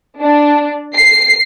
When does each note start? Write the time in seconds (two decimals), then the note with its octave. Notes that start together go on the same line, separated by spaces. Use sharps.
0.20 D4
0.95 C7